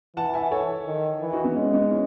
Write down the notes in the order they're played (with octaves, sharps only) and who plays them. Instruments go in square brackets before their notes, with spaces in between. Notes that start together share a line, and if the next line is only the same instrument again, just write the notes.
[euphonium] E3 [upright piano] F#5 A5
[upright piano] E5 G#5
A4 C#5
[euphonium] D#3
E3
[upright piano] D#4 F#4
B3
[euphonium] G#3 [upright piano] C#4
[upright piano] B3 D#4
C#4 E4